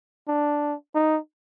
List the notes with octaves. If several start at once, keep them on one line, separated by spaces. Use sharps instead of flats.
D4
D#4